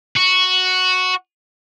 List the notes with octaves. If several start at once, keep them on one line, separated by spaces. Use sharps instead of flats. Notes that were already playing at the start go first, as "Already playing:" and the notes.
F#4